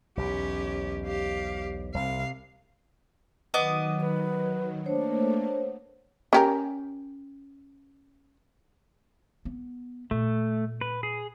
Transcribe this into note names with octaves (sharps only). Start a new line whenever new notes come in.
B1 E2 C#4 G4
G4 F5
C2 C3 F5
D#3 F#3 B3 D#5 D6
B4
A3 A#3 D4 C5 C#5
C#4 G4 A#4
B3
A#2 A3
B4
G#4